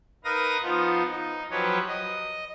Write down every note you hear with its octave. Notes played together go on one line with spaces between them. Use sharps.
D#4 A#4 B4 F5 D#6 A#6
F3 B3 D#4 F4
D#4
F3 F#3 G4 B4 C#5
D#5